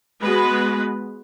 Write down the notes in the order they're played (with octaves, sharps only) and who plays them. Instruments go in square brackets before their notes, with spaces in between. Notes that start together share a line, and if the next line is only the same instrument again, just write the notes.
[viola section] G#3 B3 F#4 B4